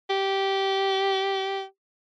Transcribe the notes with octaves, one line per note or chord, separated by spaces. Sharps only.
G4